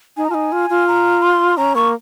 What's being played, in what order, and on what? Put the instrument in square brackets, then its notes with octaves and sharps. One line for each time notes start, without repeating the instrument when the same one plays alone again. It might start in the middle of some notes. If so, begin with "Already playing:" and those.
[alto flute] D#4 [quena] G#5
[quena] A#5
[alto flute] D#4 F4 [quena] G#5
[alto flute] F4
F4
[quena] A#5
C6
[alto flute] C#4 [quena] A#5
[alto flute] A#3 [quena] C#6